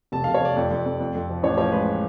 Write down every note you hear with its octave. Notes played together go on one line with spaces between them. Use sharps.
F1 A5
F1 F5
C#5
F1 D5
F2
F2
F2
F2
F2
F3
A1 C#5
F3 C#5
G#3 B4